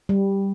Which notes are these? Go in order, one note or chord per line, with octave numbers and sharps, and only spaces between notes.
G3